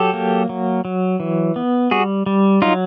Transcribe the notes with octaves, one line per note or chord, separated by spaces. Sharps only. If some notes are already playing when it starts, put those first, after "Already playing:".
Already playing: F#3 G4 A4
A#3
F#3
F#3
E3
B3
G3 F#4 G#4
G3
F#3 D#4 F4